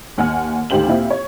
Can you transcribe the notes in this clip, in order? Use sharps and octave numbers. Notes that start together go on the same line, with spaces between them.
D#2 F#5 G#5 F6
D2 D#3 G4 C5 F5 F#7
A#2 C4 E4 G4 F5
C#5